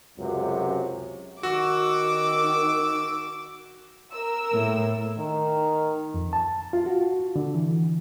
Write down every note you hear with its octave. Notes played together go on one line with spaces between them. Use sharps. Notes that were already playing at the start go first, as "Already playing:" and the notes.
C#2 F#2 C3 F#3
D#3 F#4 D6 E6
A#4 E6
A2
D#3
F2
A5
F4
F#4
D3
E3